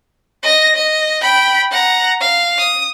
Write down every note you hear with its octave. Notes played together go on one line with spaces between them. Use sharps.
D#5 A#6
D#5
G5 B5
F#5 A#5
F5
D#6